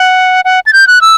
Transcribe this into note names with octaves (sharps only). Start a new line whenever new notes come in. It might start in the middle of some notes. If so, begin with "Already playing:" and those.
Already playing: F#5
F#5
A6
G6
F#6
E6